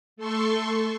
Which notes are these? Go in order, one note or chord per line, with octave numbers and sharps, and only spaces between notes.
A3 A4 C6 C#6